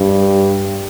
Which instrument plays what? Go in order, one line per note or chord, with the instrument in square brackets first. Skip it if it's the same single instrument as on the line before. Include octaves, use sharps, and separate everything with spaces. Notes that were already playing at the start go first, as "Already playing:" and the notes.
Already playing: [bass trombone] G2